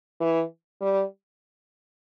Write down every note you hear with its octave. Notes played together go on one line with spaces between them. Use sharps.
E3
G3